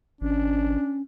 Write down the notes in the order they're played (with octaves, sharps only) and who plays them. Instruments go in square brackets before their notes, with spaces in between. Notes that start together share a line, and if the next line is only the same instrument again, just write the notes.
[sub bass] G#1 [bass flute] C#4 [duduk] D4